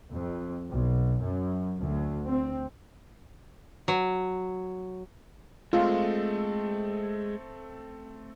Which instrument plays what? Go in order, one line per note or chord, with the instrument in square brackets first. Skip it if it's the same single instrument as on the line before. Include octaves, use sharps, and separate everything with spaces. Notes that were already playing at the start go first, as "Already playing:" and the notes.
[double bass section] F2
B1
F#2
D2
C4
[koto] F#3
[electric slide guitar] G#3 [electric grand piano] A3 C4 A4 [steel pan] F4